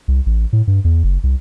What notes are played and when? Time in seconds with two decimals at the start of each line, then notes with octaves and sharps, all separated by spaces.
0.08 C2
0.26 A1
0.53 A2
0.67 G2
0.84 E2
1.04 F#1
1.23 C2